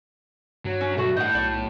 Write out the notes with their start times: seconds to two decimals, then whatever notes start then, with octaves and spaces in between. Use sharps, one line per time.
0.65 G2 F#3
0.81 C#4
0.97 B1 A3 F#4
1.17 A2 D#5 F#5 G6
1.35 B1 D5